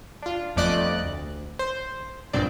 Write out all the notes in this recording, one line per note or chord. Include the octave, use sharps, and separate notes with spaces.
D4 F4
G1 F2 A3 D5 D#5 F#6
D2
C5
A#1 G2 C#3 C4 D4 D5